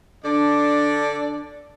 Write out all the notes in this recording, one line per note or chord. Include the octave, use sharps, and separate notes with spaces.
D3 D4 D5